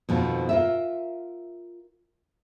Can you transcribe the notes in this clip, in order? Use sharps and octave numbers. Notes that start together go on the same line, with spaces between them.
F2 B2 D#3 F3
F4 A#4 E5